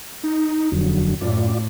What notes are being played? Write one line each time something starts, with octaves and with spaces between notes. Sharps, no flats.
D#4
D#1 F2 D3 F#3
F#2 A2 F4 D5